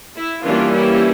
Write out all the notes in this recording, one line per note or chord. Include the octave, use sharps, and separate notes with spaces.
E4
E3 G3 A#3 C#4 D4 F4
E4 G4